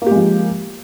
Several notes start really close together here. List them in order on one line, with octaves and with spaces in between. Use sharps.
A#3 G4 G#3 F3